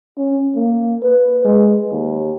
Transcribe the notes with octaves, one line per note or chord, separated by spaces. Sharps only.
C#4
A#3
B4
G#3
D#2